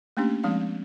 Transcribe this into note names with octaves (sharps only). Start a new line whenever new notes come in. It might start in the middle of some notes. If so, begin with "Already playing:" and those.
A3 A#3 C#4 D4 G4
F3 G#3 C4 D4 F5